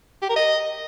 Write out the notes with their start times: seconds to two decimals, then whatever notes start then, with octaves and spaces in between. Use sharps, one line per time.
0.22 G4
0.29 A#4
0.36 D#5